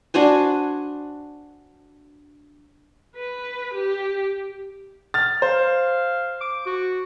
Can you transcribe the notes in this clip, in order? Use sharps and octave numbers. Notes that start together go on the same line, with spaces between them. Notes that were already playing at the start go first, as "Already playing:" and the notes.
D4 F#4 C5 G#5
B4
G4
F6 A6
C5 F5
D6
F#4